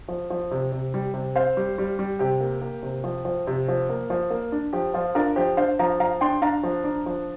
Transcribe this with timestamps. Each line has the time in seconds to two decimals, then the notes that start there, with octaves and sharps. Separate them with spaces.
0.08 F3
0.30 F3
0.51 C3
0.72 C3
0.94 G3
1.14 C3
1.36 C4 C5 F5
1.57 G3
1.78 G3
1.99 G3
2.19 C3 G4
2.40 A#3
2.62 A#3
2.83 C3
3.04 F3
3.25 F3
3.47 C3
3.68 F3
3.89 A#3
4.10 F3
4.30 A#3
4.52 D4
4.73 F3 G4
4.94 F3 F4
5.15 D4 F4 A#4
5.36 F3 G4 C5
5.57 D4 C5 F5
5.79 F3 F5 A#5
6.00 F3 F5 A#5
6.21 D4 G5 C6
6.42 D4 F5 A#5
6.63 F3
6.84 D4
7.06 F3